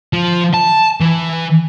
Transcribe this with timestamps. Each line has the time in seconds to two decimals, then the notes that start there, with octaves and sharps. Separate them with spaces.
0.13 F3
0.54 A5
1.00 E3